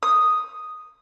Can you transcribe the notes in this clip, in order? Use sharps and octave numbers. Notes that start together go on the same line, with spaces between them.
D#6